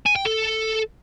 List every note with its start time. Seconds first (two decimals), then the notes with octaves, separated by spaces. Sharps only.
0.06 G#5
0.15 G5
0.25 A4